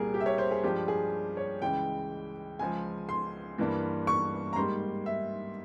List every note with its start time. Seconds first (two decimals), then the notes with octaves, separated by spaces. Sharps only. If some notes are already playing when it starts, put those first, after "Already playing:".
Already playing: C2 A#2 G3 A#3 G#4 A#4
0.14 G4
0.20 E5
0.26 C#5
0.38 C5
0.51 G#4
0.63 G2 F3 G#3 G4
0.88 G#4
1.37 C#5
1.62 C#2 C#3 E3 G#3 G5
2.59 C#2 C#3 F3 G#5
3.09 C6
3.58 G2 E3 A#3
4.07 C#6
4.53 A#5
4.56 G#2 G3 A#3 C6
5.06 E5